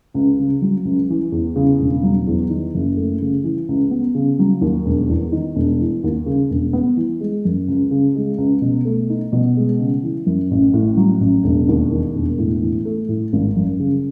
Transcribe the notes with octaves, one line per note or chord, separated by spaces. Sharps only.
C#2
C#3
F#3
C#2
E3
E2
C#3
E1
F#3
E2
D#3
F#1
A3
C#3
E3
C#2
B3
C#3
F#3
D#2
E1
E2
D#3
E1
E3
D#2
C#3
E1
B3
E3
G#3
F#2
C#2
C#3
G#3
C#2
B2
A3
D#4
B2
G#3
C#3
E3
F#2
A1
A2
F#3
A1
E1
D#2
D#3
E1
A2
E3
A3
A2
G#1
F#2
C#3